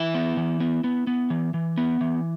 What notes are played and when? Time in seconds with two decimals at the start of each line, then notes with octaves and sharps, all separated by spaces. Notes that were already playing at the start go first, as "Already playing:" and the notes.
Already playing: E3 E4 E5
0.14 B3
0.37 E3
0.60 B3
0.84 B3
1.07 B3
1.30 E3
1.54 E3
1.78 B3
2.01 E3